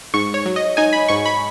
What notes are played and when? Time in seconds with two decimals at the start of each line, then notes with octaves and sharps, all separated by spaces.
0.14 G#2 C#6
0.34 C#5
0.46 F#3
0.56 D#5
0.77 D#4 G#5
0.93 B5
1.08 G#2 C#6
1.26 B5